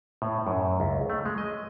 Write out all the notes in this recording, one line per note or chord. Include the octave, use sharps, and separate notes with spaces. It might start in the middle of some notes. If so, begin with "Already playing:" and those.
A2
F#2
C#2
A3
G#3
D#5